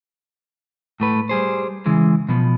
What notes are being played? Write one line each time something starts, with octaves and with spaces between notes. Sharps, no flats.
A2 A3 B4
G3 G#4 C5
C#3 E3 G#3
B2 F3 B3